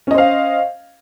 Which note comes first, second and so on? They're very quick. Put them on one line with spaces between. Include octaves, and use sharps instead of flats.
C#4 D#5 C5 F5